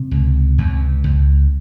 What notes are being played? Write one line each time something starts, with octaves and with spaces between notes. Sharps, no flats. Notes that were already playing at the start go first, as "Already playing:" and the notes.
Already playing: C3
C#2
C#2
C#2